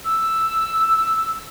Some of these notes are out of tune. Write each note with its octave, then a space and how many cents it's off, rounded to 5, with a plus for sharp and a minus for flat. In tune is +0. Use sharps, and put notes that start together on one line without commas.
E6 +0